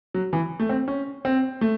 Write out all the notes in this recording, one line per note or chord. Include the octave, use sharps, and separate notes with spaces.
F#3
E3
A3
C4
C#4
C4
A3